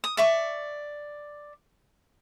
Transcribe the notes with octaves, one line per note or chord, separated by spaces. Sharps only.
D#6
D5 E5 C#6